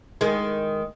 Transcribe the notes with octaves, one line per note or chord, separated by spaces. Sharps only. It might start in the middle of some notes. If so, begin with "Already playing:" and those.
D#3 G#3